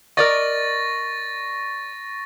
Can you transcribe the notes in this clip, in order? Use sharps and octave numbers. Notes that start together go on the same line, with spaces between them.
A#4 D5 D#5 C#6 A6 A#6